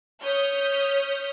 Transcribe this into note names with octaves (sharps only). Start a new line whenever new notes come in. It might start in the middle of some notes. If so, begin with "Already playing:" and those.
C#5 D#6 F6 G6 B6